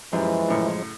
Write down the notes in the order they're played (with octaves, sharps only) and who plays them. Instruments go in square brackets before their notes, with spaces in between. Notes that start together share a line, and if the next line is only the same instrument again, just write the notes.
[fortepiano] F#2 G3 [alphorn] E3 [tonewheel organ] F3 G#3
[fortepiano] F#2 A2 C#3